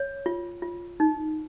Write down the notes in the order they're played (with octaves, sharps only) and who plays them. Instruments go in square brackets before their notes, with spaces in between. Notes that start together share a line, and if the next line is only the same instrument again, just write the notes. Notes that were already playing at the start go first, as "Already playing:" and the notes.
Already playing: [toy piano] C#5
F4
F4
D#4